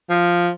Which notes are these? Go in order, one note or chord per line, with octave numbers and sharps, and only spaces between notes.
F3